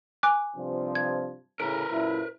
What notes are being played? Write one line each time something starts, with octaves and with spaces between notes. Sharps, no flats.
G#5 D6 F#6
G2 C3 F3
G#6
A2 C#3 A#4 B4 A#5 D7
F#2 A#2 E4